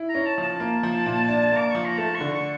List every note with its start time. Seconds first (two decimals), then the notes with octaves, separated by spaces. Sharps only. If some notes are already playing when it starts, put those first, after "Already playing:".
Already playing: E4
0.09 A#5
0.15 C#4
0.26 A5
0.38 F3 A5
0.60 A#3
0.83 F3
1.06 A#2
1.29 D4
1.52 A#3
1.58 D6
1.71 F3 C#6
1.85 A#5
1.98 A3 A5
2.15 C#6
2.20 D3
2.33 C#6